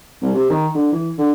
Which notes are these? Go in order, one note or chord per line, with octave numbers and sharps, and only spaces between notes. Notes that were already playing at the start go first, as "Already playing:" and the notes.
C2
C3
D#3
D3
E3
D3